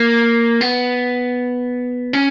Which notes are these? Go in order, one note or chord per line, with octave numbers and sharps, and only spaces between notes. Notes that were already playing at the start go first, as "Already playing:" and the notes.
Already playing: A#3
B3
C#4